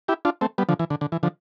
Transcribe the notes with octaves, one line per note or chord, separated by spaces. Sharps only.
E4 G4
D4 F4
A3 C4
G3 B3
D3 F3
E3
D3
D3
E3
D3 F3